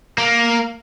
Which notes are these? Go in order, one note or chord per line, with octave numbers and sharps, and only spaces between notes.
A#3